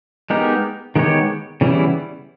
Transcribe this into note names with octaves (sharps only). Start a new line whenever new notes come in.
G#3 B3 D#4 G4 A#4
D#3 G#3 B3 G4 C#5
C#3 E3 G3 B3 E4